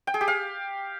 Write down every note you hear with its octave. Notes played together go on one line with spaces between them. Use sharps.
G5
G#4
G4
F5